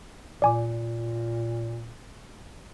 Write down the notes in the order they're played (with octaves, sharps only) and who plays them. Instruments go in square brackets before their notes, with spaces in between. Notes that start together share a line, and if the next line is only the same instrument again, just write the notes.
[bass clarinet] A#2 [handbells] D5 G#5 D6